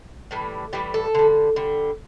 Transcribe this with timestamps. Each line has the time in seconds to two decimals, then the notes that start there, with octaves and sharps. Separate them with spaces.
0.31 A2 E3 G3
0.73 A2 E3 G3 G4
0.94 A4
1.15 D3 G3
1.56 D3 G3